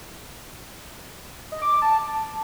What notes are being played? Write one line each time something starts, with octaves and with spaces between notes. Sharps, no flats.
D#5
D6
D6
A5